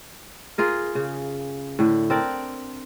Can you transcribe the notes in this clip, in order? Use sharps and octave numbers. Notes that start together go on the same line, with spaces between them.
F4 G#4 A#4
C#3
A2 D3
C4 D4 A#4 D5